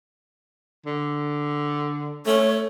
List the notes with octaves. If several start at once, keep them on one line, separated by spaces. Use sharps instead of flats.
D3
A3 C#5